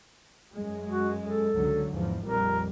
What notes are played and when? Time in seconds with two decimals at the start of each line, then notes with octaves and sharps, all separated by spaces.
0.56 F#2 G#3
0.89 F#4
1.24 A4
1.56 C#2 D3 F#3
1.91 E2 G#2 F3
2.24 A#1 F2 G3 A#4